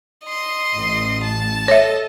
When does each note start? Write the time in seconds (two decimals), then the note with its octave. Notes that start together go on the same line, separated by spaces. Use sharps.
0.25 D#5 C6
0.75 A1
1.23 A5
1.68 A4 C#5 D#5 E5